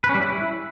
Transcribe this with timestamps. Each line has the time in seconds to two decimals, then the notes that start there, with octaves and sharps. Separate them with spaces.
0.04 B4
0.09 C#4
0.15 G3
0.20 E4